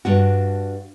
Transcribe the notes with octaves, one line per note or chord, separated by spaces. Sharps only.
G2 D4 F#4